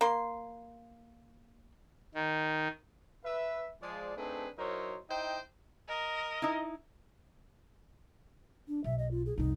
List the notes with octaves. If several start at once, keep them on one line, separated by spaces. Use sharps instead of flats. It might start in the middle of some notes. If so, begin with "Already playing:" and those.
A#3 C6
D#3
B4 E5
F3 G#3 D5
A3 C4 D4 D#4 G#4 B4
F#3 D#4 E4 A#4 C5 C#5
D#4 E4 C5 D#5 G5
A#4 D#5
D#4 E4
D4
B1 E5
D#5
F4
G#4
C2 F2 D#4